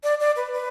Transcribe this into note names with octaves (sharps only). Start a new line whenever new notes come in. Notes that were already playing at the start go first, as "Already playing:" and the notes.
D5
D5
B4
B4